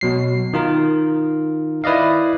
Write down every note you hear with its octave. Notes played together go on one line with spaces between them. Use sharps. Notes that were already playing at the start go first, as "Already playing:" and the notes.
B2 F#3 C7
D#3 F4 A#4
E4 B4 D5 D#5 F5